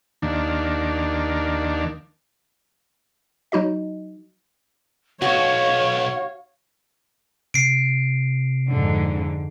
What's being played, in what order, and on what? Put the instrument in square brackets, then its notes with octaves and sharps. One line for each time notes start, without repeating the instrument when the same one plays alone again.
[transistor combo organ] D#2 D#3 A#3 D4
[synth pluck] F#3 D#4 F#4 D#5
[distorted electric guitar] B1 [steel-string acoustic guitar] F#4 [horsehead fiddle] C#5 [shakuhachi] F5
[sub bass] C3 [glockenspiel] C7 D7
[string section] F2 G#2 D3